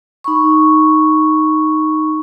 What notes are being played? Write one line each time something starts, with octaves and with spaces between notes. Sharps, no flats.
D#4 B5 C#6